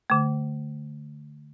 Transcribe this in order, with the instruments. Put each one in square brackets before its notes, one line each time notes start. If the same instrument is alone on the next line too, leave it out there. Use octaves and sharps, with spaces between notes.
[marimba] D3 A3